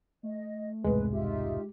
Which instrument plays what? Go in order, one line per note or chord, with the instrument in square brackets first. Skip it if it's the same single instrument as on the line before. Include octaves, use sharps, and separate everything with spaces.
[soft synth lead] A3 [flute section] D#5
[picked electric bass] E1 C2 G#2 [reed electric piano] G#3 [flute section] B4
[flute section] D#4 F4 E5 [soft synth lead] G4